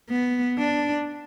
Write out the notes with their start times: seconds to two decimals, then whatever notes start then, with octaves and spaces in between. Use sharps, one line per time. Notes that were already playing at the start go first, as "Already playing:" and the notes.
0.10 B3
0.59 D4